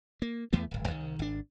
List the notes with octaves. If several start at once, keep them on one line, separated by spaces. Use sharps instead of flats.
A#3
E2 E3 A3 B3
D1 G#1
C2 D#3
G#1 D4